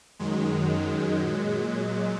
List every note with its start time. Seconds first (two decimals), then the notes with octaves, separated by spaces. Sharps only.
0.19 F#2 D#3 F#3 G#3
1.14 A#2 F#3